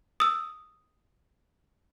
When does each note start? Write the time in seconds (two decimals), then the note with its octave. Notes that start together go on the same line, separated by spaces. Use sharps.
0.20 D#6 E6